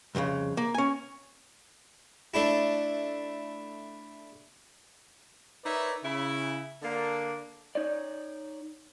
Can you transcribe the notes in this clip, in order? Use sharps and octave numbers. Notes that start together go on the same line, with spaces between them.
C2 F2 A#2 C#3
A#3
C#4 G#5
A3 D4 E4
D#4 A#4 B4 C#5 D5 E5
C#3 E4
D3 A#3 D4
D#4 C#5 D5